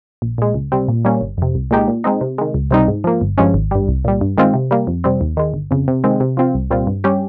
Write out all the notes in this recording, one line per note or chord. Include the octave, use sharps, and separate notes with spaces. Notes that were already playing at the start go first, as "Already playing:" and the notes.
A#1
A#2 G#3
C#2
C3 G3 C4
A#2
G3 A#3 C#4
G1
F2 C3
C2
A#2 G#3 D#4 G4
A#2
G#3 C4 D#4
C3
D#3 G#3
C#2
C3 G3 C4 D#4
G#2
F3 A#3
G1
G2 F3 G#3 C#4
G#1
G2 G3
C2
A#2 G3
G2
D#3 G#3 C4 F4
C3
G3 A#3
F2
C3 G3 C4
D#2
D#3 G#3
G1
F2 C#3
C3
D#3 G#3 C4
C3
F3 C4 F4
C2
A#2 G3 C4 F4
G2
G3 C#4 G4